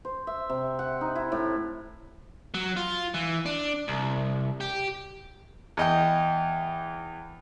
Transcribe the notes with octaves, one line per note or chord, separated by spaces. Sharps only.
C5
E5
C3
F#5
D#4
E4
A2
F#3
F4
E3
D4
C2
G4
E2 D#5 G5